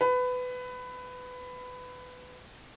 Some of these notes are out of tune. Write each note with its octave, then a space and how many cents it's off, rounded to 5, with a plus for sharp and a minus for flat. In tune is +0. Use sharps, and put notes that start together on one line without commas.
B4 +20